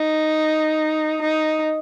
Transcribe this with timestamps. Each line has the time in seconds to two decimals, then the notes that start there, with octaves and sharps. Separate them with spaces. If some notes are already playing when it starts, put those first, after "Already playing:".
Already playing: D#4
1.22 D#4